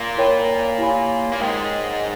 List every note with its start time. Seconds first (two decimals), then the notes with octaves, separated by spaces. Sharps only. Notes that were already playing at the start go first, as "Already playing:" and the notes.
Already playing: A#2 A#3
0.17 E4 A#4 C#5 G5 B5
0.78 E4 G4 C#5 G#5 B5
1.33 A#3
1.40 G#2 G#3 A#4 C#5 G5